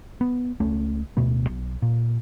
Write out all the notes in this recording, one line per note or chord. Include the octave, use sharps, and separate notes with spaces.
B3
C#2 A3 C#4
D1 B2 A3 B3
B1
A#2